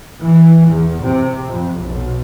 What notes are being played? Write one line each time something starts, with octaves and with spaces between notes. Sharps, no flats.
E3
E2
C3
F2
B1